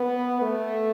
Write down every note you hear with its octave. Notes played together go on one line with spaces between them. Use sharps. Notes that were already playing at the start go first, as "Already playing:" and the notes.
Already playing: B3
A3